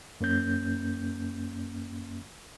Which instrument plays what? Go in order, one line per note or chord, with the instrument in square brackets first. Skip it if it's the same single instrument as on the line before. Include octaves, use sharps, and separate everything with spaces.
[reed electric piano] F#2 A#3 C#4 G6